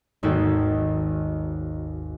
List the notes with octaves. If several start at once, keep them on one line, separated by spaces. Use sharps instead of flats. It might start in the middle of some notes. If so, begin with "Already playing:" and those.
G#1 D#2 F#4 A4 G5